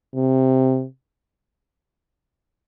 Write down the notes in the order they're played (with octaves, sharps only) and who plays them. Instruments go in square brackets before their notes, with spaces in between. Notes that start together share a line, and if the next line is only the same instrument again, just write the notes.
[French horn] C3